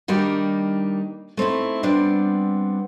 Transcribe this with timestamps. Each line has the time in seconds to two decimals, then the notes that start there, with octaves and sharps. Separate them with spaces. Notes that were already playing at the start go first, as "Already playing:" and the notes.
0.08 D#3 G3 A#3 D4 D#4 G4
1.37 A3 C4 D#4 E4
1.83 G3 B3 C4 D4